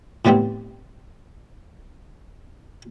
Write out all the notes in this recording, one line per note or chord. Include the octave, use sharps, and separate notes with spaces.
A2 E3 G3 B3 C4